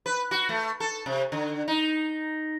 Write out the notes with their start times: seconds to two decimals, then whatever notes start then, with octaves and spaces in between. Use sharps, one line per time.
0.06 B4
0.31 F#4
0.49 A3
0.80 A4
1.06 C3
1.32 D3
1.68 D#4